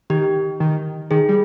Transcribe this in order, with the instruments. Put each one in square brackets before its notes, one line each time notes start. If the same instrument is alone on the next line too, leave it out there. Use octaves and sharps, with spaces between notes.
[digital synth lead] D#3 [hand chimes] G4
[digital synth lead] D#3
[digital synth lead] D#3 [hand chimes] G#4
[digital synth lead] G3